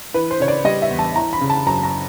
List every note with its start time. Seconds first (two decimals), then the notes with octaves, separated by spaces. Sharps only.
0.14 E3 B4
0.31 C5
0.40 C#3 C#5
0.48 D5
0.65 G3 D#5
0.82 E5
0.90 E2
0.99 A5
1.16 E3 A#5
1.33 B5
1.41 C#3
1.50 A5
1.66 F#2 A#5
1.83 A#5